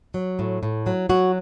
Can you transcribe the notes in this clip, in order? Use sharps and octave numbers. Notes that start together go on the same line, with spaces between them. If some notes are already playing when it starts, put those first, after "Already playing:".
F#3
A2
A2
F#3
F#3 F#4